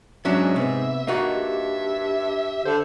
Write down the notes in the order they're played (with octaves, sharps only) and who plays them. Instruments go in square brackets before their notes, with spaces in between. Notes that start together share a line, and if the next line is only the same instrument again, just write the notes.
[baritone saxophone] G#2 [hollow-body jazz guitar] F#3 C#4 D4 [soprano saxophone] E5
[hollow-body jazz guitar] C3 [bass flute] B3
[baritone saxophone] G2 [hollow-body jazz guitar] A#3 D#4 F#4 [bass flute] D#5 [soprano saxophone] E5
[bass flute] G4
[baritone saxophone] D3 [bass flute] A4 [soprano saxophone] C5